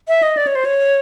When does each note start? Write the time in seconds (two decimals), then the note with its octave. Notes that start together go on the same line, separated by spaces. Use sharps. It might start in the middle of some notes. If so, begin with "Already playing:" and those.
0.08 E5
0.23 D#5
0.37 D5
0.47 C#5
0.55 C5
0.65 C#5